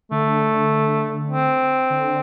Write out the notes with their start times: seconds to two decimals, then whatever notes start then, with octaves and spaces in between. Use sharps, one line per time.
0.11 D3 A3
1.32 C4
1.90 D3